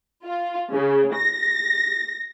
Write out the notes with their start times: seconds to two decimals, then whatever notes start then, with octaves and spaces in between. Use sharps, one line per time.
0.24 F4
0.73 C#3
1.14 A#6